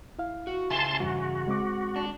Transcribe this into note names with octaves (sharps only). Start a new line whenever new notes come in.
E4 F5
F#4
C#3 E5 G#5 A5 C6
E2 G2 E3 F#4
G#3 C4 D6
D4